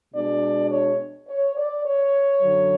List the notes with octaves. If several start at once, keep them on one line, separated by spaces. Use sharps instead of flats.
B2 G#3 D4 D5
C#5
C#5
D5
C#5
F#2 D3 F#3